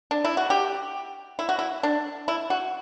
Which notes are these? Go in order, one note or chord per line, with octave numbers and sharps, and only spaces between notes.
D4
E4
F#4
G4
E4
F#4
E4
D4
E4
F#4